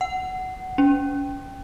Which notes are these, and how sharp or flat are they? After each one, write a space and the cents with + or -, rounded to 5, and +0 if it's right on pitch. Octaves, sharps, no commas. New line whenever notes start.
F#5 +15
C#4 +35